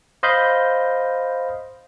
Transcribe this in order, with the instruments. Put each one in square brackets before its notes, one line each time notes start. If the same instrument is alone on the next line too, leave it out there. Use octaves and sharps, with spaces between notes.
[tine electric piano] C5 D#5 F5 B5 G6